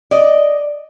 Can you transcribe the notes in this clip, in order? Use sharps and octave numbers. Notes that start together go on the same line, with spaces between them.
D5 D#5